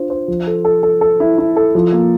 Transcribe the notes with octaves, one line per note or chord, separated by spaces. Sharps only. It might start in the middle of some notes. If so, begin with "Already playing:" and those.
Already playing: D4 F4 C5
C5
F3
A4
A4
A4
A4
E4
E4
A4
F3
A#3